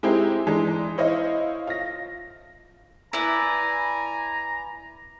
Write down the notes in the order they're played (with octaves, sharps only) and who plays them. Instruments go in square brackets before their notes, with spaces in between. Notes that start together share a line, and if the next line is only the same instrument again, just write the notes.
[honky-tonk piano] G#3 C4 D#4 E4 G4 G#4
E3 G#3 D4 D#4
E4 C5 C#5 D#5 F5
F4 A#6
[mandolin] E4 B4 [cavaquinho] D5 [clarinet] G#5 [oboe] A#5